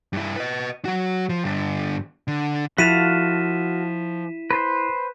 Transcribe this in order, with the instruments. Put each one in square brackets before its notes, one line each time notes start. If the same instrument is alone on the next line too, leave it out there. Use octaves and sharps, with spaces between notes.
[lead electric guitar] G2 E4
B4 D#5
F#3 F#4
F3
G2 D3
D3
[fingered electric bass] F3 [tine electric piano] E4 [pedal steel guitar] F#4 A4 F5 [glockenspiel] B6 D#7 E7
[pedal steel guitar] B4 C5